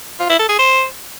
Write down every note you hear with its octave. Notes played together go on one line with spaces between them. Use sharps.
F4
E4
A4
G#4
C5